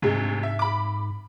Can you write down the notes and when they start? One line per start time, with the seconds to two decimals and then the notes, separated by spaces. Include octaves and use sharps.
0.02 D2 G#2 C3 G#3
0.43 E5
0.59 B5 D6